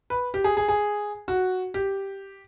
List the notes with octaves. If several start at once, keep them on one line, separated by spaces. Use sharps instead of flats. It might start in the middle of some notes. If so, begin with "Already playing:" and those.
B4
G4
G#4
G#4
G#4
F#4
G4